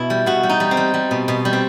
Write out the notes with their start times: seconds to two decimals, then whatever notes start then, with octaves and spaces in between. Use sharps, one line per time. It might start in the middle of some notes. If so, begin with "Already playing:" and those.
Already playing: B2 E4
0.10 G3
0.26 B2 F#4
0.43 G3
0.49 D#4
0.60 G3
0.71 C4
0.77 G3
0.94 G3
1.11 B2
1.28 B2
1.45 G3
1.53 C4